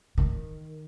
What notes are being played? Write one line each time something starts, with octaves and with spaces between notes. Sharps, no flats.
D#3